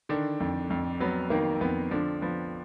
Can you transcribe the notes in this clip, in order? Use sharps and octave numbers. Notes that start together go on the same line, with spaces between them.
D3 D#3 D4
F2
F2
F#3 B3
D#3 A#3
F2 B3
D3 F3 D4
F3 B3